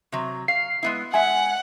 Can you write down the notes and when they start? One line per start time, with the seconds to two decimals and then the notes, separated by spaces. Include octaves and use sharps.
0.12 C3 F#3
0.48 F5 C7
0.83 G#3 B3 E4
1.14 G#3 E5 F#5 G#5